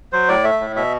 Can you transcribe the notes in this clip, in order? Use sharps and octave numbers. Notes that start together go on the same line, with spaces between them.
F#3 C5
A2 D5
A3 E5
A2
B2 E5